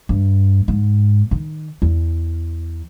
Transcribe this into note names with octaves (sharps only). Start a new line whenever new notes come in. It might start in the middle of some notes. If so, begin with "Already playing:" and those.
G2
G#2
D#3
E2